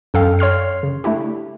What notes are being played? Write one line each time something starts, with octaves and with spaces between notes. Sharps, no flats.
F#2 A4 F5 G5
C#5 C6 F6 C7
C#3
A3 D4 E4 G4